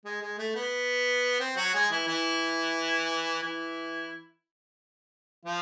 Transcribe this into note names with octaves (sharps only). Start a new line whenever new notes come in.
G#3
G#3
A3
B3
C4
F#3 F#4
G#3 G#4
E3 E4
E3 E4
E3 E4
F3 F4